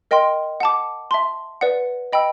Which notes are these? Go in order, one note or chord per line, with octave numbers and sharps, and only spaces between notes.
A#4 D#5 G5 C6
F#5 A5 D6
E5 A5 C6
B4 D5 F#5
D#5 G5 B5 E6